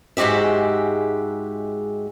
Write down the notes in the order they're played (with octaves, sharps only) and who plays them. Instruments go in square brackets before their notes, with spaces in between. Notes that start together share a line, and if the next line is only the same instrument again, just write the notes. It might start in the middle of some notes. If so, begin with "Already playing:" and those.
[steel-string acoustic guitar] G#2 G#3 F#4 G4 E5